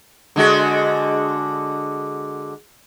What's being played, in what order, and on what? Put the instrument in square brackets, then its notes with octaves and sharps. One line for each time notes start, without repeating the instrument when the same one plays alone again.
[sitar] D3 G#3 F#4